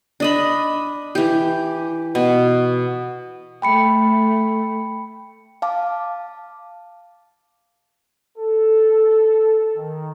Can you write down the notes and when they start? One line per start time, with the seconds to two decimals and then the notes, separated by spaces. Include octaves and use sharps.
0.20 D4 D#5 B5
1.15 E3 G4
2.15 B2
3.62 A3 G5 B5 C#7
5.62 F5 A5 D6
8.38 A4
9.77 D#3